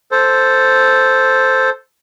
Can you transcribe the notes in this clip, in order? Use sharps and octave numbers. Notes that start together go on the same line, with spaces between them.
A4 C5